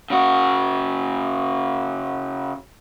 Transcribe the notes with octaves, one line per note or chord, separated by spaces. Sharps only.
C#3 F#4